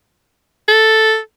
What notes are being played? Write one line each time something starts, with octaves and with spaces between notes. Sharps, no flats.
A4